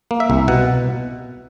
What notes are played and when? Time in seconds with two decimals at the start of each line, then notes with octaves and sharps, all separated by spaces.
0.11 A#3
0.20 E5
0.30 C2
0.48 B2 F#5